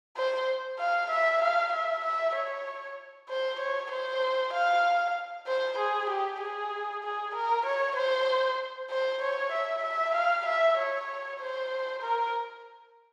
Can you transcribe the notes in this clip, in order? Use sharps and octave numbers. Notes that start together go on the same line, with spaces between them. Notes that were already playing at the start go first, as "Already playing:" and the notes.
C5
F5
E5
F5
E5
E5
C#5
C5
C#5
C5
F5
C5
G#4
G4
G#4
G#4
A#4
C#5
C5
C5
C#5
E5
E5
F5
E5
C#5
C5
A#4